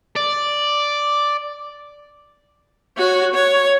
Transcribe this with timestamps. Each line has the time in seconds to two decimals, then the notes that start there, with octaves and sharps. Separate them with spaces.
0.16 D5
2.97 F#4 C#5
3.34 C#5